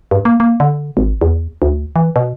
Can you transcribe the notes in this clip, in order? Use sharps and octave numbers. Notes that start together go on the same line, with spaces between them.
G2
A#3
A#3
D3
G#1
E2
D2
E3
B2